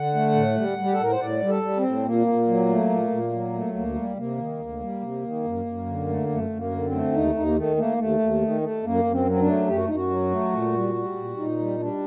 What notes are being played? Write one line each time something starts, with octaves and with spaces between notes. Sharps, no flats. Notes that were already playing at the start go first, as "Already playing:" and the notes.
Already playing: D3 F#5
A3
A2
G3
G3
G4
A4
A2 A#4
C5
A2 D5
G3
A4
G3
C4
A2
A#2 A#3
A#2
F#3
A3
A#2
A#2
F#3
A3
D2 A#3
G3
C3 A#3
D#3
D2
G3
C3
D#3
F#2
F#2
D3
A3
F#2 A3
F#2
A#3
D3
C4
A3
D#2 D#4
D#2 D#4
A#3
D#3 A3
A3 A#3
D#2 A3
D#2
D#3
A3
F#2 A#3
F#2
C4
F#3
C4
D4
A3
F#2 G4
F#4
F#2 D#4
F#4
F#3
A3
A#2
G3
G3
A#2
A#2 D#4
G3
G3 D4